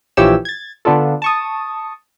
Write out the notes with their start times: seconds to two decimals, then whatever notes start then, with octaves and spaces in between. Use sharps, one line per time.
0.17 A#1 E3 F3 G4 C#5 E6
0.45 G#6 A6
0.85 D3 B3 D4 F4 A4
1.22 A5 C#6 D#6